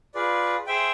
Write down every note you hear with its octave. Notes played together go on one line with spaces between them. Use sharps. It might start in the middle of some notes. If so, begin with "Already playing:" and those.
F4 G#4 B4 D5
G#4 C5 E5 G5